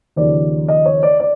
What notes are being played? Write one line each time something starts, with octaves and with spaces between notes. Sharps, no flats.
D#2 C#3 F3 D5
D#5
C#5
D5
D5